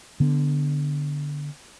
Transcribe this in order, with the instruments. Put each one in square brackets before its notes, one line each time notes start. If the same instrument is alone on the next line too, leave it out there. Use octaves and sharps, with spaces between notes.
[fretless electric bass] D3 B3